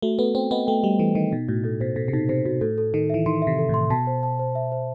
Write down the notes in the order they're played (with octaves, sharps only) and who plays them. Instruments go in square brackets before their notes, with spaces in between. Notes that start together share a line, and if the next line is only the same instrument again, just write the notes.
[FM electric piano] A3 [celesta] F#4
[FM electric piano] B3 [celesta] A4
[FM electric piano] C4 [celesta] G5
[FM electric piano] B3 [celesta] D#5
[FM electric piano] A3 [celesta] G5
[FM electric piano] G3 [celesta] D#5
[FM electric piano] E3 [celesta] A4
[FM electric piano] D#3 [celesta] D#5
[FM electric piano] B2 [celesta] D#4
[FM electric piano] A2 [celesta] F#4
[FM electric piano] A2 [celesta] A4
[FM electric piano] B2 [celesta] C5
[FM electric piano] B2 [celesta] A4
[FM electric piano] C3
[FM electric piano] B2 [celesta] D#4
[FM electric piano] C3 [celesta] C5
[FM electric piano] B2 [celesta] F#4
[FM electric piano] A2 [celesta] A4
[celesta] A4
[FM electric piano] D#3 [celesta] A4
[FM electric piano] E3 [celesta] E5
[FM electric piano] D#3 [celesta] C6
[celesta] E5
[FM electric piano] C3
[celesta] A4
[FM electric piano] A2 [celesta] C6
[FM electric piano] B2 [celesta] A5
[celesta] C5
A5
C5
E5
C5